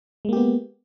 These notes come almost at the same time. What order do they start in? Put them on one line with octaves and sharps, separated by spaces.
G#3 A#3 G4 B3